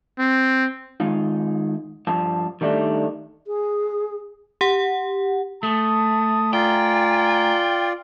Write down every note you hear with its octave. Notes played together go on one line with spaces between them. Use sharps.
C4
D#3 G#3 D#4 F4
G2 F3 A5
D#3 G3 A3 D4 D#4
G#4
G4 F#5
A3 A5 D#6
F4 D5 G5 G#5 A#5